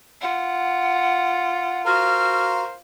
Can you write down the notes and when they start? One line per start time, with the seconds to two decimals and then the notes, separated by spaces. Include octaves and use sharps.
0.22 F4 F#5
1.86 F#4 A#4 C5 F5 F6